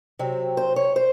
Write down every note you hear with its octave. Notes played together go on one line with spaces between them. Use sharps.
C3 F#3 C4
C5
C#5
C5